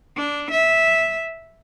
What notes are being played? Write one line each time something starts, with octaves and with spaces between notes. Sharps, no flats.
D4
E5